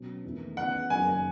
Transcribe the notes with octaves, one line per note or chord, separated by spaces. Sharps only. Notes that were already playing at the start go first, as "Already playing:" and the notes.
Already playing: B2 F#3 C#4
E2 D#3 A3 E4
C#3 E3 B3 E4 F#5
F#1 F#2 D#3 G#5